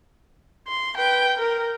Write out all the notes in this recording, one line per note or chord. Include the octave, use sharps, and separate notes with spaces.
C6
B4 G5
A#4